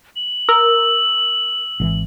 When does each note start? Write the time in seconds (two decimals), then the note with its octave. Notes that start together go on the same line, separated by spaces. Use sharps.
0.16 F#7
0.49 A#4 E6
1.80 G#1 D3 E3